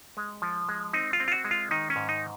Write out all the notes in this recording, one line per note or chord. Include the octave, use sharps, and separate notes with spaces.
G#3
F3
G#3
C4 D#4
F4
C4
F4
F#4
G#3
F4
D#3 D#4
C#4
G#2
D#4